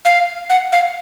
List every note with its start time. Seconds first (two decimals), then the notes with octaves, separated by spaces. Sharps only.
0.05 F5
0.50 F#5
0.72 F5